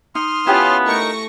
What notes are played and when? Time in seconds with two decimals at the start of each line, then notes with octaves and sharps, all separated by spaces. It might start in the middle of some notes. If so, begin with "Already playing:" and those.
0.15 D#4 C6 D#6 F6
0.47 B3 C#4 E4 F4 G4 G#5 A5
0.87 A3 D#4 A#4 C#6 A#6